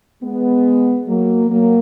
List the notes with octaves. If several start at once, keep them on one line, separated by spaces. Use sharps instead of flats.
G#3 B3
F#3 A#3
F#3 A#3